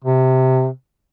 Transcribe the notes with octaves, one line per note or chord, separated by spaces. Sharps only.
C3